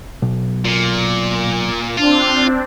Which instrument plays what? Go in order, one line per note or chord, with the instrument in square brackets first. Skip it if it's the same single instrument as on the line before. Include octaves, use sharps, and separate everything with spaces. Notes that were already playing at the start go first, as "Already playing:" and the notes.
[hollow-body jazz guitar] B1
[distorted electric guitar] A#2
[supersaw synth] C4 D4 [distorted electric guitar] F4